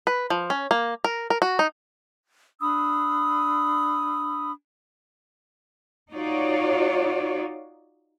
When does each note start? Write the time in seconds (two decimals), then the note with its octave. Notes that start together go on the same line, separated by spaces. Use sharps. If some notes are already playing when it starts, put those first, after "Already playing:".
0.07 B4
0.30 F3
0.50 C#4
0.71 A#3
1.04 A#4
1.30 A#4
1.42 F#4
1.59 D#4
2.60 D4 B5 D#6 E6
6.13 D#4 F4 F#4 C#5 D5